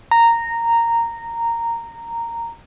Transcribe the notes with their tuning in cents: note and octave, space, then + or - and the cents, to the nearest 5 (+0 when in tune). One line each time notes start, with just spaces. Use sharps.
A#5 -10